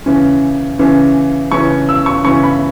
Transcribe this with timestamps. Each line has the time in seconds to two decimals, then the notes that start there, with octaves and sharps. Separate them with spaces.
0.06 C#3 E3 C#4
0.79 C#3 E3 C#4
1.52 C#3 E3 C#4 C#6
1.89 E6
2.06 C#6
2.24 C#3 E3 C#4 C#6
2.43 B5